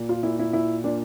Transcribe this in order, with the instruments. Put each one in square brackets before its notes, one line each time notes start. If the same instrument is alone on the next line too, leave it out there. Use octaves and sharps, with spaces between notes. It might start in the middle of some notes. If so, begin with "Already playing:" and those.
Already playing: [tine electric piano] A#2
[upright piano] F4
[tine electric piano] A#2 [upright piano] E4
[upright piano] E4
[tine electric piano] A#2 [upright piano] E4
[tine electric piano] A#2 [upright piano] D4